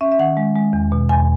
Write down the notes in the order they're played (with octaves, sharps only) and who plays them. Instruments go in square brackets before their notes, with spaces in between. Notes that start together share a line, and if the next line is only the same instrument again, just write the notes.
[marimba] C#4 E5
E5
D#3 F#5
G#3
G#3
E2
B2
E2 G#5